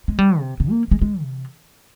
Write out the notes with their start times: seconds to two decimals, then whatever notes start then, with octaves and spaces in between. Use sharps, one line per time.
0.08 G#3
0.19 G3
0.39 C3
0.60 C3
0.71 A#3
0.91 G#3
1.02 G#3
1.22 C3